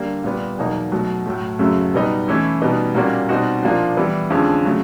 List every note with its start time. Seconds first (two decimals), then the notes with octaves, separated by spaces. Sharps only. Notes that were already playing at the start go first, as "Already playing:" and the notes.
Already playing: D3 G3 A#3
0.24 A#2 G3 B3
0.58 E2 B2 F#3 A#3 D#4
0.92 B2 F#3 A3
1.26 A2 F#3 A3
1.59 F#2 C#3 F#3 A3
1.94 B2 G3 B3 D#4
2.28 E3 A3 C#4 E4
2.62 B2 G3 B3 D#4
2.95 A#2 G3 A#3 C#4 F#4
3.29 B2 G3 C4 D#4 F#4
3.63 A#2 F3 A#3 D4
3.97 E3 G3 B3
4.30 F2 D3 F3 G#3 C#4
4.65 C#3 F#3 A3